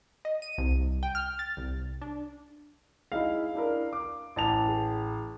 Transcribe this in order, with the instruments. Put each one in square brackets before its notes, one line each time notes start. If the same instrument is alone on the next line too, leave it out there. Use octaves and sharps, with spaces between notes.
[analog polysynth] D#5
D#7
C2
G5
F6
A6
C2
D4
[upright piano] G#3 D#4 E4 [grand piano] F5
[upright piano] D4 E4 A#4
D6
[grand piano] A1 A5 F7
[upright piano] G#4